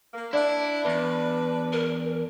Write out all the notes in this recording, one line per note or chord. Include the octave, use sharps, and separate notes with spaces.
A#3
D4 E4 D5
E2 D4 B4
A#4